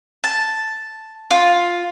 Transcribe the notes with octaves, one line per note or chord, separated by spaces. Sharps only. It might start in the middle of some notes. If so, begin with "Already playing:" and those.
A5
F4